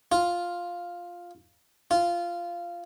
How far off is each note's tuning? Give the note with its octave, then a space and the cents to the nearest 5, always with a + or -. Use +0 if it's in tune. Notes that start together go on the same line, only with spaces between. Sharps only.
F4 +5
F4 -10